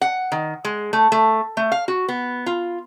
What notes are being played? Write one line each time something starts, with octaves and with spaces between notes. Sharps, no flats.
F#5
D#3
G#3
A3
A3
A3
F5
F#4
B3
F4